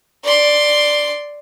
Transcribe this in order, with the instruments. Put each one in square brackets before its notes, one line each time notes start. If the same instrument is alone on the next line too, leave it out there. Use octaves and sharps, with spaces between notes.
[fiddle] D5 C6